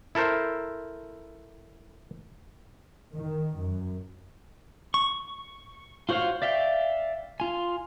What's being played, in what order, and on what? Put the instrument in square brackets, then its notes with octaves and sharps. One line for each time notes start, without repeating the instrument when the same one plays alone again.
[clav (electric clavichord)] E4 A4 A#4 C5
[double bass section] D#3
F#2
[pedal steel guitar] C#6
F4 F#4 C5 C#5 F5
D5 E5 F5 G5
F4 G#5